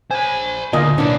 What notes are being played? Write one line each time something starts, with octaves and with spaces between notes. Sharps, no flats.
C5 G#5 B5
D2 A#2 A#3 F4 D#5 G#5
B1 E3 A#3 C#4 D4